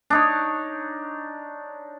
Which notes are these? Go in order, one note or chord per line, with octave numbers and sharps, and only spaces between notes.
D4 D#4 C#5